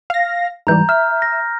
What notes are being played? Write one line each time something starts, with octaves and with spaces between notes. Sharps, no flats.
F5 A#6
G#2 E3 G3 A#5 G6
E5 F6
A#6